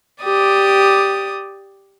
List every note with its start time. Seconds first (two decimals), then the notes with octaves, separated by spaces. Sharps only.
0.23 G4 D5 D#6